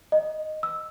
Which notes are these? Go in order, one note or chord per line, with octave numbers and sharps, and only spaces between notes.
D#5
E6